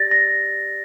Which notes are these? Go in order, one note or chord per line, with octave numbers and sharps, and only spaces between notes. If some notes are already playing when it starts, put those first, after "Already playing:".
Already playing: G4 D5 A6 A#6
A#6